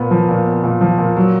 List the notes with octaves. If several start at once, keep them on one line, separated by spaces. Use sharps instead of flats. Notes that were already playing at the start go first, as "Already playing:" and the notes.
Already playing: A#2 B3
F3
A#2
B3
A#2
F3
A#2
F#3